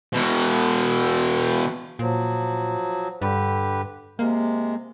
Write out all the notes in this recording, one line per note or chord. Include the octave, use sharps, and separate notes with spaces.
B2 E3
A#2 F3 F#3
G2 D3 G4 B4
C3 G#3 A#3